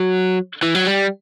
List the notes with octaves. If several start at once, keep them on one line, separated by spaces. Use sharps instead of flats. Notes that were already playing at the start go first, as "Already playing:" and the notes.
Already playing: F#3
E3
F#3
G3